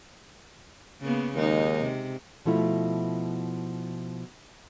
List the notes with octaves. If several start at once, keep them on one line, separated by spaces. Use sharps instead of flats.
C#3 A#3 B3
D#2 G#3 D#4
C3
B2 F3 A3 E4 F4